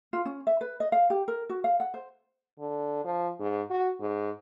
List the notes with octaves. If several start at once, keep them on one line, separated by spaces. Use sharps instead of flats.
F4
C#4
E5
B4
D#5
F5
G4
A#4
F#4
F5
F#5
C5
D3
F3
G#2
F#4
G#2